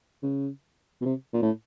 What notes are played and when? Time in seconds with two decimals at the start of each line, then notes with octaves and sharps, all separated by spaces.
0.23 C#3
1.01 B2
1.05 C3
1.34 A#2
1.42 A2